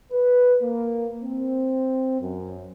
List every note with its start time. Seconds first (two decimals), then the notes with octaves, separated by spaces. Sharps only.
0.11 B4
0.62 A#3
1.23 C4
2.21 F#2